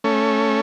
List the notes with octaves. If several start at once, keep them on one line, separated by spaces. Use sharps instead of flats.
A3 C#4